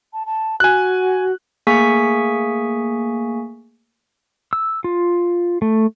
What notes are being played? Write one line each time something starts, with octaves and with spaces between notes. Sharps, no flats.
A5
A5
F#4 G#5 F#6
A3 A#3 G#4 G#5 C#6 B6
E6
F4
A3